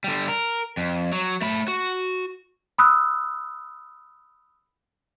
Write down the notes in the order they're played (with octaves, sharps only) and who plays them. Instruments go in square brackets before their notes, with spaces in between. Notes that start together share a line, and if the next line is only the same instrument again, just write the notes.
[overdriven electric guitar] D3 G3
A#4
F2
F#3
A3 B5
F#4
[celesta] B5 D#6 E6 F#6